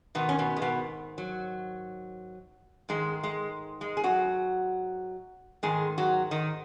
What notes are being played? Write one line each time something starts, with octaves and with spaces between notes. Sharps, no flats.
G#2 B2 D#3 B3
C#4
B2 B3
G#3
B2 B3
F#3
G#2 D#3 G#3
G#3
G#3
G#4
F#3 F#4
G#2 D#3 G#3 G#4
F#3 F#4
D#3 D#4